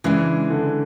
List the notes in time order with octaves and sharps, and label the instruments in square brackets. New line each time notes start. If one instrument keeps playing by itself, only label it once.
[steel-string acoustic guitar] C#3 G#3 D4 [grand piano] E3
[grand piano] D3